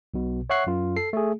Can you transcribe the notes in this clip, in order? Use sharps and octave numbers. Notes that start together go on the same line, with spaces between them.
B1 B2
C#5 E5 F#5 C#6 F#6 C7
F#2 F4
A4 C7
A3 G#4